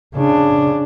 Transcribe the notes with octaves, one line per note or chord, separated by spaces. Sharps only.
C#3 D4